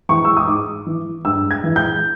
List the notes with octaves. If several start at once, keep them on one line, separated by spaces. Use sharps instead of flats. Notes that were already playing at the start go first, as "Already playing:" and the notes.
E3 C#6
E6
D#6
G#2 D6
E3
G2 E6
G#6
E3
G6